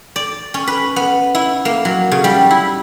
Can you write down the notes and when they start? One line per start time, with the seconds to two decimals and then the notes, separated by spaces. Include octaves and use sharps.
0.16 D5
0.54 C#4
0.67 B4
0.96 B3
1.35 E4
1.65 A#3
1.85 F#3
2.11 C#3
2.24 G3
2.51 E4